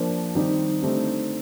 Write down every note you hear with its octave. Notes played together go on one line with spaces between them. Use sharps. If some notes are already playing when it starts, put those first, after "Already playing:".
Already playing: F3 A#3 D4 F4 C5
D#3 G3 C4 D#4 G4
D3 A3 C4 D#4 G4